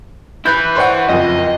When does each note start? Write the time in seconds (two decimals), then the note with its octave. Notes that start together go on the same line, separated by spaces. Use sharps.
0.46 E4 B4 B5 F#6 G6
0.76 C5 C#5 F#5
1.09 F#1 F2 D#5